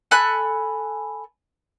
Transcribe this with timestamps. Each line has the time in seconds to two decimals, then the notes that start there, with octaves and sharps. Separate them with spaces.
0.11 A4 G#5 B5 F#6